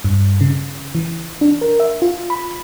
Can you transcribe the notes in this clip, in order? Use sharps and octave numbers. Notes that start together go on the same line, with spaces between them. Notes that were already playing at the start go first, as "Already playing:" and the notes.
G2
C#3
E3
D4
A#4
E5
F4
B5